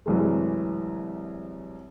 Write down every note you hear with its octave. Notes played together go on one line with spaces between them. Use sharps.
C2 F#2 E3 G#3 A3